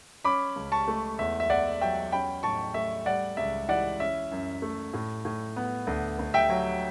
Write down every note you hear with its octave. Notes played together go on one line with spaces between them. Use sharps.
C#4 B5 D6
C#2
A5 C#6
A3
E2 E5
E5
E2 D5 F#5
F#3 E5 G5
C#4 G5 B5
A2 A5 C#6
A3 E5
G3 D5 F#5
C#2 E5
E3 D5 F#5
C#4 E5
F#2
A3
A2
A2
B3
D2
D2
E5 G5
F#3